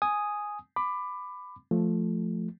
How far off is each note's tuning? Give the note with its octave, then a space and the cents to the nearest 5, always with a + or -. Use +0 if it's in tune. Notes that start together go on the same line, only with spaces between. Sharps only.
G#5 +0 D#6 +0
B5 +15 D6 +15
F3 +0 A3 +0